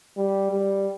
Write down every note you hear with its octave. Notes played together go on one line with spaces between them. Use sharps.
G3
G3